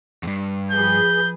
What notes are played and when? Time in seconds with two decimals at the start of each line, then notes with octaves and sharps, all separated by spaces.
0.23 E2 G2
0.71 F3 G#4 B4 G6